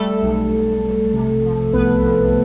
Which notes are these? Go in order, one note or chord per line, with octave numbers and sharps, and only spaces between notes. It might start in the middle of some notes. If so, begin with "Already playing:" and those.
Already playing: G3 A3 A4
B1
B1
B1
C3
F3
C2 B3 B4
F3